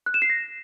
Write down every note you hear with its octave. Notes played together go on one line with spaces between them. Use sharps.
F#6
E7
C7
A#6